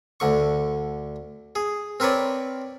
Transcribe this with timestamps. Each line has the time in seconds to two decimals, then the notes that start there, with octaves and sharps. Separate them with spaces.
0.20 D2 D3 C#6
1.55 G#4
2.00 C4 A#4 B4 C#5 D5